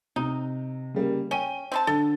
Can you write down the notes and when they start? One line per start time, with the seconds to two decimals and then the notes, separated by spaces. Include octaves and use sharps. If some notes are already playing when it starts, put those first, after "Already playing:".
0.16 C3 D#4
0.94 C#3 G3 A#3
1.31 C#4 G5 D#7 G7
1.72 C4 B4 A5
1.87 D3 A4